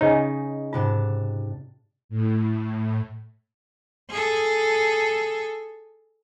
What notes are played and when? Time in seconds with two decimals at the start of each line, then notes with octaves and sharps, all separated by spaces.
0.01 C#3 D#4 C#5 D#5 G#5
0.73 G#2 C3 F4 A5
2.09 A2
4.10 G#4 A4